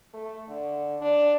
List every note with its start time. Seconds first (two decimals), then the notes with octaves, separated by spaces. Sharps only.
0.14 A3
0.48 D3
1.01 D4